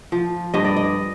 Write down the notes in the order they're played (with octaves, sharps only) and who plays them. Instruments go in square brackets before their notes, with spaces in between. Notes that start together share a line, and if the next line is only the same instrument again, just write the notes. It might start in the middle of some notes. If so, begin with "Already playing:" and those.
[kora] F3
G2 D#5
D5
D#5